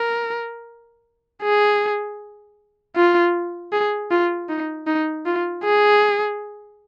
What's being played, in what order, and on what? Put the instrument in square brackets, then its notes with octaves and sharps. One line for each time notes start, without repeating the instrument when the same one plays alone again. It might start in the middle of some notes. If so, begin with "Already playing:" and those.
Already playing: [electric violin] A#4
G#4
F4
G#4
F4
D#4
D#4
F4
G#4